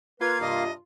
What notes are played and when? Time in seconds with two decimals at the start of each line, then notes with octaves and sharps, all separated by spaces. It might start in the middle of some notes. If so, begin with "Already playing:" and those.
0.21 A#3 F4 B4 F5 G#6
0.41 G2 C3 D#5